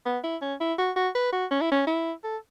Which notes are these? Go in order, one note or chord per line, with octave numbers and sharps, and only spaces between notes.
B3
E4
C#4
E4
F#4
F#4
B4
F#4
C#4
E4
C#4
E4
A4